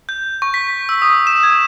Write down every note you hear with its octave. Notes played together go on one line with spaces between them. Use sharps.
G6
C#6
B6
E6
D#6
E7
G#6